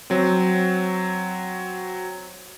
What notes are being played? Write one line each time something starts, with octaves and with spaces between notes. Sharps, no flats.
F#3 C4